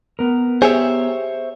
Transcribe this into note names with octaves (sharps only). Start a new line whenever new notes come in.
B3 A#4
G4 G#4 C5 C#5 E5